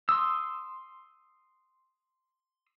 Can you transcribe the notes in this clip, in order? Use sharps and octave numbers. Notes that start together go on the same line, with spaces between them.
C6 D#6 E6